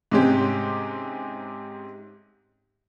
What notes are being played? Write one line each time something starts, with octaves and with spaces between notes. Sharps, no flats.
G#2 C3 G#3 C#4 G4